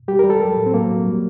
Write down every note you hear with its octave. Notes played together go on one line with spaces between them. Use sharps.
G3 G4
G3 A#4
A4
F#3
A2
C4
F#3 A#3
F#3
G3